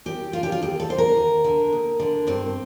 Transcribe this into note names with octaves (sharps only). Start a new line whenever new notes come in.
D#2 G4
D3 F4
G4
F4
D#2 G4
A4
D3 C5
A#4
D#2
D3
D#2
D3
G2 C4